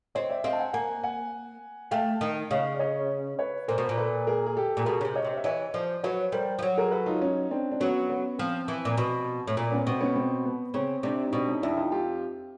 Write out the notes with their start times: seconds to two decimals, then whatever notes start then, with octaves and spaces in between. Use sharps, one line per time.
0.15 C4 C#5 D#5
0.29 D5 E5
0.44 C4 D#5 F5
0.53 A5
0.59 F#5 G#5
0.73 A#3 F#5 G#5
1.03 F#5 G#5
1.91 A3 F5 G5
2.21 D#3
2.51 C#3 D#5 F5
2.75 D5
2.79 C#5 D#5
3.39 B4 C#5
3.68 A#2 A#4 C5
3.78 B2
3.89 A#2
3.97 A4 B4
4.27 G#4 A#4
4.46 G#4
4.57 G4 A4
4.77 A#2
4.85 B2 G#4 A#4
5.01 C#3
5.05 C3
5.15 C#5 D#5
5.25 C3
5.37 E5
5.44 E3 C#5 D#5
5.74 F3 C5 D5
6.03 F#3 B4 C#5
6.32 G3 A#4 C5
6.59 F3
6.62 F#3
6.77 G#4 A#4
6.91 A4 B4
7.06 D#4 F4
7.21 C#4 D#4
7.51 C4 D4
7.72 D4
7.80 F#3 B3 C#4
8.09 B3 C#4
8.39 F3 C4
8.68 E3
8.85 A#2
8.98 B2
9.48 A2
9.57 A#2
9.71 B3 C#4
9.87 B2 C4
10.01 B3 C#4
10.16 C4
10.45 B3
10.74 C#3 C4
11.03 C3 C4 D4
11.25 D#4
11.33 B2 C4 D4
11.47 C#4 D#4
11.62 F2 D4 E4
11.77 D#4 F4
11.92 F4 G4